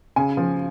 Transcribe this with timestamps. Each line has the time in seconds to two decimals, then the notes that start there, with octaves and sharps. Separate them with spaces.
0.16 C#3 G#5
0.37 F3